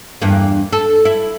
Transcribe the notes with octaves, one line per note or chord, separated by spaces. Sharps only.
E2 G2 A#3
A4
E4